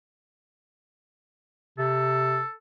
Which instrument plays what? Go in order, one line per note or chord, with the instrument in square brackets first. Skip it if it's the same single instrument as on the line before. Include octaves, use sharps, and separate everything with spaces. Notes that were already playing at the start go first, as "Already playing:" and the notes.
[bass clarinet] C3 [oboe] A4